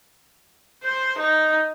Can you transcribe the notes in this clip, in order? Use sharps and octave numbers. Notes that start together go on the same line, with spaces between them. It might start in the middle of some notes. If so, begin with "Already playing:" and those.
C5
D#4